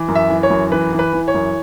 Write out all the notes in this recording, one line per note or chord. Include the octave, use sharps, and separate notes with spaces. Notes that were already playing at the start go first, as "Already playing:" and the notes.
Already playing: E3
F#2
E5
E3
C#5
F#2
E3 B4
E3
B4
E3
C#5
F#2